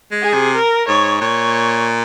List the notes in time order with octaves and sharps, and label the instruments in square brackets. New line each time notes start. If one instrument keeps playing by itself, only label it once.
[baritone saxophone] G#3
[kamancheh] G#4
[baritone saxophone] C3
[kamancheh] A#4
[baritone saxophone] G#2 [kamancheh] C#5
[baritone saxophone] A#2 [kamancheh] C#5